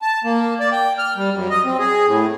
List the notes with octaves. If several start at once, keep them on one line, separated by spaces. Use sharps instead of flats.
A5
A#3
D5
G5
F6
G3
F#2
D#5
C4
G#4
A2